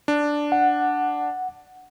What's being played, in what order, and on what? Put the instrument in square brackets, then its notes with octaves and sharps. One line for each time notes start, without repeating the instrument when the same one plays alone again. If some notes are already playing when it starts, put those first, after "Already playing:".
[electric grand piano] D4
[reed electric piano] F#5